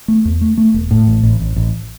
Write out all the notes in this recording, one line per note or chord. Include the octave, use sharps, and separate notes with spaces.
A3
E2
A3
A3
E1
A2
A1
A1
A1
A1